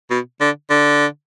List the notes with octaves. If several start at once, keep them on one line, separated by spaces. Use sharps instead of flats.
B2
D3
D3